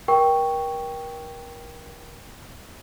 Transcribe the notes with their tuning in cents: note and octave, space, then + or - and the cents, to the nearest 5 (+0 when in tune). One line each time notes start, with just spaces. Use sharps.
A#4 +30 G5 +0 C#6 +0